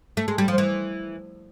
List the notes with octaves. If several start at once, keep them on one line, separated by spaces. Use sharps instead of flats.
A3
G#3
G3
F3
E3